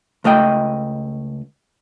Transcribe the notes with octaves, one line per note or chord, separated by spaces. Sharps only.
C#2 A3 D#5 G5